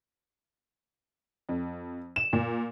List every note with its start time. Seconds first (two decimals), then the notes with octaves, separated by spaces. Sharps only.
1.49 F2
2.16 E7
2.33 A#2